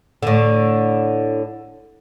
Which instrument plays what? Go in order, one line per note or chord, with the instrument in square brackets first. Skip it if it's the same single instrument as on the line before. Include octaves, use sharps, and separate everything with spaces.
[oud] A2 D3